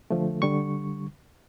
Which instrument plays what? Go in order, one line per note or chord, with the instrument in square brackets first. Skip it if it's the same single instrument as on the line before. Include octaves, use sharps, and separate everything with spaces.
[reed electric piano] D3 F3 A3
D3 G3 C#6